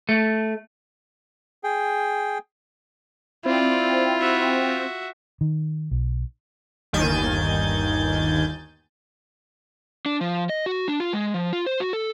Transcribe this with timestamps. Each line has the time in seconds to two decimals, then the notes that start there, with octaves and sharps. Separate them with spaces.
0.09 A3
1.64 G#4 G5
3.46 C4 E4 F4 D5
4.20 F#4 E5
5.41 D#3
5.91 B1
6.93 G1 D#2 D#3 G#5 G6 A6
10.06 D4
10.21 F3
10.49 D#5
10.66 F#4
10.88 D4
11.00 F4
11.13 G#3
11.34 F3
11.53 F4
11.66 C5
11.80 F#4
11.93 A4